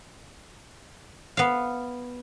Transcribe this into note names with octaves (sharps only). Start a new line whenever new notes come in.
B3 F5